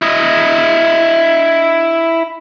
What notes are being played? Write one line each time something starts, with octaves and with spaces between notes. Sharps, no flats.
E4 D#5